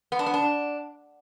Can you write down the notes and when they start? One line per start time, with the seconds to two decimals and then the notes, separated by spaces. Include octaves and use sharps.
0.12 B3
0.19 D4
0.26 B3
0.34 D4